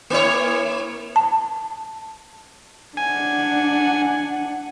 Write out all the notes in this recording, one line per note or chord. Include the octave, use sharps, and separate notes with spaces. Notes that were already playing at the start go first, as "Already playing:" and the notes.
A#3 E4 C#5
A5
D4 F#5 G#5